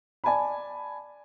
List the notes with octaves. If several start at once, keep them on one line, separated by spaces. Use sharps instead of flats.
D5 G#5 A5 B5